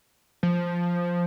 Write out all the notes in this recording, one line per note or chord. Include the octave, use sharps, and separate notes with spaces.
F3